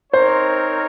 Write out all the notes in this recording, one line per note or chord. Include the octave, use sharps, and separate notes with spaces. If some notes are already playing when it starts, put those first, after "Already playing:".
C4 D#4 A#4 C5 C#5